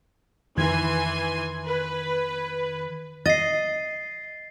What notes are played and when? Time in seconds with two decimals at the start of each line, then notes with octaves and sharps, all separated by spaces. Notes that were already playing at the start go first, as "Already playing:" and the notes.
0.57 F2 D#3 E3 G#5 C6 G#6
1.66 B4
3.26 D#5 A6 C7